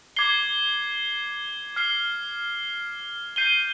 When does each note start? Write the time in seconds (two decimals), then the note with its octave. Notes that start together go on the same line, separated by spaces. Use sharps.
0.16 D6 G#6 C7 G7
1.76 F6 C7 G7
3.36 G6 C7 D#7 G7